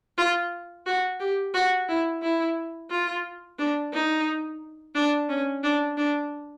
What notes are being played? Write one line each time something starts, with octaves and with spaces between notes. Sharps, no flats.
F4
F#4
G4
F#4
E4
E4
F4
D4
D#4
D4
C#4
D4
D4